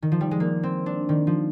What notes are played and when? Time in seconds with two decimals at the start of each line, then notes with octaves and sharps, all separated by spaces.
0.02 D#3
0.12 F3
0.21 G3
0.31 G#3
0.40 A#3
0.63 C4
0.86 D4
1.09 D#3
1.27 F3